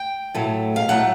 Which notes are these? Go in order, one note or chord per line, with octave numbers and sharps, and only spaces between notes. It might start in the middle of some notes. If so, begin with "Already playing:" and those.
Already playing: G5
A2 F#3 A3
F5
A2 F#3 A3 F#5